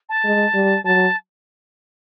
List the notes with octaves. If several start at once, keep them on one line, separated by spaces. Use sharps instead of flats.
A5
G#3
G3
F#3 A5